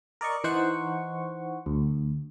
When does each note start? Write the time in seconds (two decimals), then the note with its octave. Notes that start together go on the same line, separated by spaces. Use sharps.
0.21 A#4 D5 D#5 C#6
0.44 E3 D#4 C5 F#5 C#6
1.66 D2